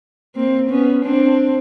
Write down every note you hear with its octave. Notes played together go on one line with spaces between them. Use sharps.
A#3 C4
B3 C#4
C4 D4